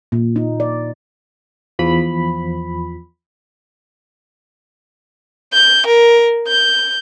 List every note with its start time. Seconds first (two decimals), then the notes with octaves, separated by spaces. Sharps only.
0.12 A#2
0.36 D#4
0.60 D5
1.79 E2 F3 B5
5.53 G6
5.87 A#4
6.48 G6